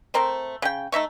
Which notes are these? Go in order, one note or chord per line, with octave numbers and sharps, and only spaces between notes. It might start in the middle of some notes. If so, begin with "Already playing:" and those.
A3 C4 A#4 C5
C#3 G5
A3 D#4 E5 C#6